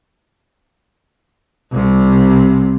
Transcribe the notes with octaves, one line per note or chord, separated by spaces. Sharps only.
C2 C3